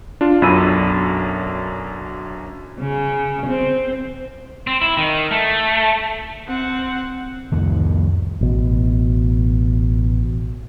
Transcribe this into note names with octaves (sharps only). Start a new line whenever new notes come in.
D4 F4
B1 F#2 D4 B5 E6 D#7
C#3
C4
C4
E4
D#3
A3
C4 F#5
C2 F2 D#3
A1 B2